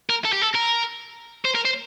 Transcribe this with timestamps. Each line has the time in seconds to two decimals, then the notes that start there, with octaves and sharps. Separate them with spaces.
0.10 A#4
0.25 A4
0.33 G4
0.42 A4
0.55 A#4
1.45 C5
1.55 A#4
1.65 C5